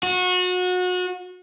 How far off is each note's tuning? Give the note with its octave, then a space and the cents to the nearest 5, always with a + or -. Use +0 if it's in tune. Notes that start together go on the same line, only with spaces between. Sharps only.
F#4 -30